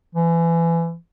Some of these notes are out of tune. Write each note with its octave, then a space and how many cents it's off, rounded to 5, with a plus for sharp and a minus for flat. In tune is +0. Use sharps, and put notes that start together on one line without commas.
E3 +25